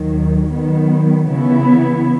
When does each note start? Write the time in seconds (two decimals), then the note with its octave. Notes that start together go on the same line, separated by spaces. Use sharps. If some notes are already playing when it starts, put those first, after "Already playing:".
Already playing: D#2 D#3 F#3
0.50 D#3 F#3 B3
1.27 C#3 E3 B3 E4